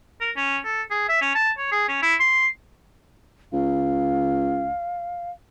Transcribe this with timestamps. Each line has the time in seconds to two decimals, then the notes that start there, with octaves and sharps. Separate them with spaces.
0.21 A#4
0.37 C#4
0.65 A4
0.91 G#4
1.09 E5
1.21 C#4
1.35 A5
1.58 C#5
1.72 G#4
1.89 C#4
2.02 E4
2.20 C6
3.53 C#2 F5